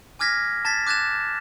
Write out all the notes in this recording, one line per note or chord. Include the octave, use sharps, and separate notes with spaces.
G#5 D6 F6 G#6 A#6 B6
A5 G#6 A6 B6
D6 F#6 G#6 A6 E7